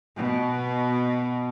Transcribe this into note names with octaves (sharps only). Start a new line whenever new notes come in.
B2